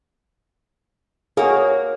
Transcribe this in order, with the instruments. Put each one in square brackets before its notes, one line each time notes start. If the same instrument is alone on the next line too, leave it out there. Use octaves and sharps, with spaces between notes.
[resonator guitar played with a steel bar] A#3 F#4 [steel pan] G#4 [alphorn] C#5